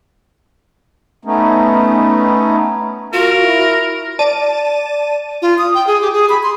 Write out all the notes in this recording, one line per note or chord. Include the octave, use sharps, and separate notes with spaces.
A3 B3 C#4 D#4
F4 F#4 A#4
E4
D5 A5 D#7
F4
D#6
G5
G#4
G4
G#4
B5
C6